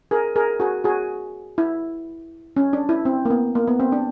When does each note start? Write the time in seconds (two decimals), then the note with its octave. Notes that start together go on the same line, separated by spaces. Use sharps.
0.11 G#4 A#4
0.36 G#4 A#4
0.60 F#4 G#4
0.84 F#4 G#4
1.58 E4
2.56 C#4
2.73 D4
2.89 E4
3.05 C4
3.25 A#3
3.30 B3
3.55 A#3
3.67 B3
3.80 C4
3.92 D4